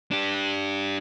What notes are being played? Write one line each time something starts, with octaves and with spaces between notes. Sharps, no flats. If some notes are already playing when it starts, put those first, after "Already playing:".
D4 G4